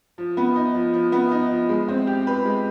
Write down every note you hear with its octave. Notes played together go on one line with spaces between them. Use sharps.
F3
B3
D#4
F3
F3
B3
D#4
F3
G#3
C4
G4
B4
G#3